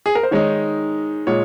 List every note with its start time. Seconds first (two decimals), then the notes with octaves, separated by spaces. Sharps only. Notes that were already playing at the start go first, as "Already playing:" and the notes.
0.06 G#4
0.15 A#4
0.23 C5
0.31 D#3 G#3 D#4 C#5
1.27 A#2 G#3 C#5